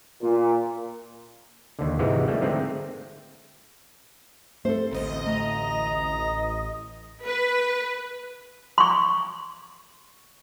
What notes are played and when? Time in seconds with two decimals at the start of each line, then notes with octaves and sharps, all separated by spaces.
0.22 A#2
1.79 D#2 D3
1.99 G#2 C3 E3 G#3 F#4
2.28 G3 A3 A#3
2.42 D3 G#3 A3 C4 D#4
4.65 A3 C4 A4 C5
4.91 A1 D2 D#5
5.27 A3 A#5
7.25 B4
8.78 C6 C#6